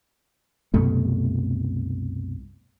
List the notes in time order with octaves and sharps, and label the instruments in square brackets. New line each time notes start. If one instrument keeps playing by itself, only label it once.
[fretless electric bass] C2 F#2 B2 A3